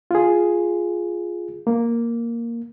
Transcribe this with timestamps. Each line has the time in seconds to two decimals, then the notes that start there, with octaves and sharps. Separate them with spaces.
0.11 F4 G#4
1.67 A#3